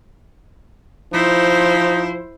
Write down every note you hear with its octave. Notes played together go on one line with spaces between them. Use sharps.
F3 D#4 E4 C5